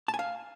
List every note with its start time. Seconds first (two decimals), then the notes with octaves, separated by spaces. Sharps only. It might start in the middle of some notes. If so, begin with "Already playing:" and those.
0.08 A5
0.14 G#5
0.19 F5